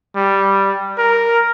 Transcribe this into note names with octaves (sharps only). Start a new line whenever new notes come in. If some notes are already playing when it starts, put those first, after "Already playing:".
G3
A#4